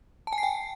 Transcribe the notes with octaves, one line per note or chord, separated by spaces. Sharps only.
A5
G#5
C7
G5